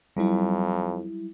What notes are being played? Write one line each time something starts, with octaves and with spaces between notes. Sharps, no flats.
F2 F#3 G3 E4